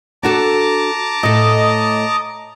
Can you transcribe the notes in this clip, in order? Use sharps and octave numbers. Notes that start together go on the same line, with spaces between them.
D4 F#4 A4 A5 A#5 D6
A2 A4 D#5